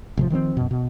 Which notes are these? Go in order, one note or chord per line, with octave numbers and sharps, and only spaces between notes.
A1 C3 F3
D#3 F3 B3 C4
F#2 B2
B2